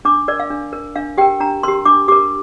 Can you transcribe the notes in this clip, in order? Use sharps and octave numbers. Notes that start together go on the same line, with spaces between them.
D4 D6
A#4 D5
F5
D4
A#4
D4 F5
G4 A#4 G5
D4 A#5
G4 A#4 C6
D4 D6
G4 A#4 D6